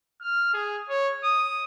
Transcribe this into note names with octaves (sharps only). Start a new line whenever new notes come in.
F6
G#4
C#5
D#6